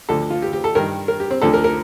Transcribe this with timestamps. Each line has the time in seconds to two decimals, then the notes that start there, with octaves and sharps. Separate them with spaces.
0.09 D2 D3 F3 A4
0.30 F4
0.42 G4
0.53 G4
0.64 A4
0.75 G2 D#3 A#4
1.08 A#4
1.20 G4
1.31 C4
1.42 D2 D3 F3 A4
1.54 A#4
1.64 A#4